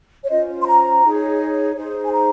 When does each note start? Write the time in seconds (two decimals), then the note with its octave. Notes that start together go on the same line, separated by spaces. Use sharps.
0.25 C#5
0.30 C#4 F4 C5 D#5
0.62 C6
0.66 A#5
1.04 D#4 G#4 C#5
1.76 D#4 G#4 C5
2.06 G#5
2.12 A#5